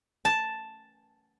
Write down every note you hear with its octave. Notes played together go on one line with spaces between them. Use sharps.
A5